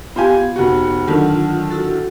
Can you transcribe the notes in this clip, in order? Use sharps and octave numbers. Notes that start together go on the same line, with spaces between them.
B3 F4 G4 G#5
F1 F#4
D3 D#3 F#3 F4 A5
E4 F#4 A4